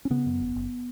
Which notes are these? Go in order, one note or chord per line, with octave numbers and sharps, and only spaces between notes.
C#4
C#3 B3
F#2
F#1
F#1